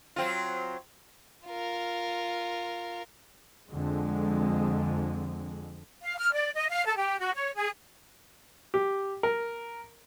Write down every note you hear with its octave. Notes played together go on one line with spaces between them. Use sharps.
F#3 C4 F4
F4 A#4
F2 D3 G#3
F5
F6
D5
D#5
F5
A4
G4
F#4
C#5
G#4
G4
A#4